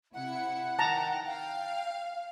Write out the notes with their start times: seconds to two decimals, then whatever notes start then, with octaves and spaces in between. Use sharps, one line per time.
0.14 C3 E4 F#5 C#7
0.79 D#3 G5 A5 A#5
1.27 F5 G5